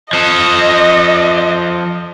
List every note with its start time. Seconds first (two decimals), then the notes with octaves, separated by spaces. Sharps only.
0.13 F3 A4 D#5